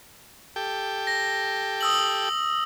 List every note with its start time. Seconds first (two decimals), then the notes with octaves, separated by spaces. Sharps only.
0.56 G4 A4 G5
1.07 A#6
1.81 D#6 E6 F#7